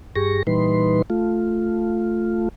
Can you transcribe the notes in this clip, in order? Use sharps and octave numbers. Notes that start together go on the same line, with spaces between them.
G2 G4 G#4 C#6 A#6
A#2 E3 G3 D#4 B4 C6
A3 F4